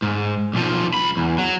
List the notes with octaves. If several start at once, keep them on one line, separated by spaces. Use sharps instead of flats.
G#2
B1 F3
C#2 B5
E2
F#3